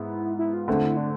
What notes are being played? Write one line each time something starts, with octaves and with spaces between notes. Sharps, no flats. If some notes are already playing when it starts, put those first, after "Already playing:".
Already playing: G#2 G#3 B3 E4
E4
F4
D3 A3 C4 G#4
F4
E4
D4